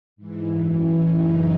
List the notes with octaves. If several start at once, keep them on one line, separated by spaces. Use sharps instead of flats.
G#2 E3
F#2 E3
A2 E3 C#4
F#2 C#3 E3 D#4